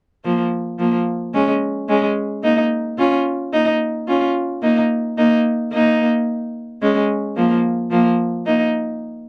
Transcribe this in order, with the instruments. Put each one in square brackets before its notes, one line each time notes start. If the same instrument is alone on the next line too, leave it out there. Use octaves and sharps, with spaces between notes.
[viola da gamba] F3 A#3
F3 A#3
G#3 C#4
G#3 C#4
A#3 D#4
C#4 F4
A#3 D#4
C#4 F4
A#3 D#4
A#3 D#4
A#3 D#4
G#3 C#4
F3 A#3
F3 A#3
A#3 D#4